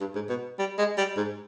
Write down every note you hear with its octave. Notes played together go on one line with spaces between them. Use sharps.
G2
G#2
B2
G3
G#3
G3
G#2